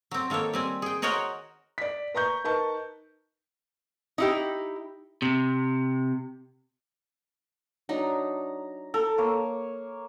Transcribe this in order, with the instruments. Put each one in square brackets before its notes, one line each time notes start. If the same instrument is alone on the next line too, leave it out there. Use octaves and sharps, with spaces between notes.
[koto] F#3 C4
D#3 A#3 A4 C5 C#5
G3 C4 G#5
G#4 G5
F#4 A#4 C5 C#5 D#5 F#5
[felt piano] D5 B6
B4 A#5 C#6 G6
D#4 A#4 B4 A5 C#6
[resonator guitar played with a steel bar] D#4 E4 G4
[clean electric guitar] C3
[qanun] F#3 D4 D#4 [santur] A#5
[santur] A4 [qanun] A#4
[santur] A#3 C#5